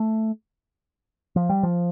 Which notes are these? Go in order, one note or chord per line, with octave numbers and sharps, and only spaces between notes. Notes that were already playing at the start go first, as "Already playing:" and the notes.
Already playing: A3
F3
G3
F3